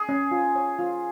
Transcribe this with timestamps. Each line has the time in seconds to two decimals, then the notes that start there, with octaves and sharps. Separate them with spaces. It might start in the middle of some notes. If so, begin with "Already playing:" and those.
Already playing: G#4
0.09 C#4
0.31 F4
0.56 C#5
0.79 F4